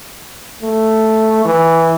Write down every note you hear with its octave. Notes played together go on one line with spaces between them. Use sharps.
A3
E3